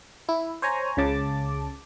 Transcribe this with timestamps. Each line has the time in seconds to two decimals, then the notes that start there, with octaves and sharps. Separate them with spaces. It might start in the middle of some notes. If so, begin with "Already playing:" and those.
0.29 E4
0.62 C5 C#5 G#5 A#5
0.97 C#2 C#3 A5 D6